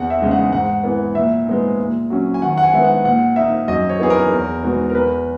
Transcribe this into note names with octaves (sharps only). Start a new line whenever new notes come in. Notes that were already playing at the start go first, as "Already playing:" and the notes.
Already playing: E2 F#5
E5
C#3 G#3 D#4
F#5
G#2 F#5
E3 B3
A#2 E5
G#3 B3 D#4
A#2
F#3 C#4
G#5
D#3 F#5
F#5
G#5
G#3 B3 D#4 E5
F#5
A#2 F#5
A#3 D#4 E5
F#2 D#5
C#5
E3 B3 D#4 G#4
A#4
E2
B2 G#3 B3 D#4
A#4
E2 B4